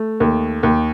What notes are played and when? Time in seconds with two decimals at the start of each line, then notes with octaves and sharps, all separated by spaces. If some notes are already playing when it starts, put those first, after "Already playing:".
Already playing: A3
0.20 D#2
0.63 D#2